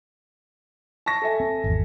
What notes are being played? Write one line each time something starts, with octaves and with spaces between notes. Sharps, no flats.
A5 C#6 A#6
A4 E5 G#5
C4
G#1 E2